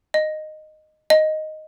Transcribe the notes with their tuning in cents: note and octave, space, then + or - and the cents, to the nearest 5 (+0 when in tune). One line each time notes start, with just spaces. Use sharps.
D#5 -10
D#5 +0